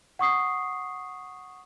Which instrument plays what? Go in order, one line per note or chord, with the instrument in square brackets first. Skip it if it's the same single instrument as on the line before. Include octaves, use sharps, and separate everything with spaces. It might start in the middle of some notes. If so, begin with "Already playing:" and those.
[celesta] F#5 C#6 D#6 C7